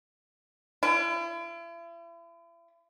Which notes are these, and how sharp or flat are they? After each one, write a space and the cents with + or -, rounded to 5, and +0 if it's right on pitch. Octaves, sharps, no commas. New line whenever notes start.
E4 +40